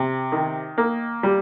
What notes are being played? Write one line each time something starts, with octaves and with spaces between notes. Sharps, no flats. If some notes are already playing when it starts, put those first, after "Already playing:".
Already playing: C3
D#3
A#3
G3